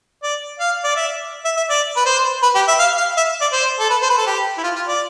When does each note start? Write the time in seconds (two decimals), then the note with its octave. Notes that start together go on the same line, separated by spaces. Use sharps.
0.23 D5
0.60 F5
0.84 D5
0.96 E5
1.45 E5
1.57 E5
1.70 D5
1.97 B4
2.06 C5
2.43 B4
2.55 G4
2.68 E5
2.79 F5
2.98 F5
3.17 E5
3.41 D5
3.53 C5
3.79 A4
3.90 B4
4.02 C5
4.10 B4
4.18 A4
4.27 G4
4.58 E4
4.64 F4
4.76 F4
4.87 D5